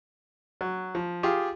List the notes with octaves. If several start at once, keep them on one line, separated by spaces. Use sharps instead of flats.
F#3
F3
F4 G4 G#4